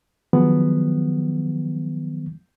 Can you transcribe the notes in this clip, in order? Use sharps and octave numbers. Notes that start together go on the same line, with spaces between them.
D#3 F3 F#3 G#3 B3